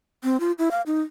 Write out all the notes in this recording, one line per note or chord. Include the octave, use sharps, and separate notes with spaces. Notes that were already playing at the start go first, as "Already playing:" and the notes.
C4
F4
E4
F5
D#4